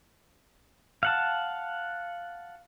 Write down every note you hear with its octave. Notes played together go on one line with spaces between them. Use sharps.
F5 F#5 A5